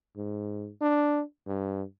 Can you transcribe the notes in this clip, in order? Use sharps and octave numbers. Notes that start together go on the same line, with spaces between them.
G#2
D4
G2